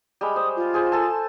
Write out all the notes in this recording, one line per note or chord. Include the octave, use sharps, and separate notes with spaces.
G3 G#3 B5
C5 D#6
F4
G#4 C5
A4 G#5 A5